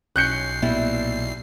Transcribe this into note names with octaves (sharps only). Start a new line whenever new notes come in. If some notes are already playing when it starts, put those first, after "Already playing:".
B1 C#4 F#6 G6 C7 C#7
A#2 G3 A#3 B3 E4